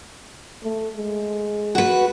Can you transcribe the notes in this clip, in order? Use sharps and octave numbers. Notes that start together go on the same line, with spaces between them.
A3
G#3
F#4 B4